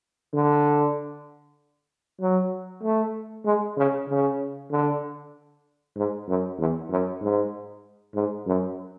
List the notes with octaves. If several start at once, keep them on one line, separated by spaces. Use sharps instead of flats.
D3
F#3
A3
G#3
C#3
C#3
D3
G#2
F#2
E2
F#2
G#2
G#2
F#2